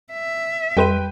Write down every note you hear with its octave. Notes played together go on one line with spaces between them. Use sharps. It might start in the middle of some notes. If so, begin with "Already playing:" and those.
E5
F2 G3 B4 G5 C6 D#7